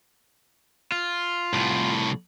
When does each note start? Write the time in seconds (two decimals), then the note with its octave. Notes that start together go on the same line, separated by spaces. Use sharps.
0.92 F4
1.53 C2 A2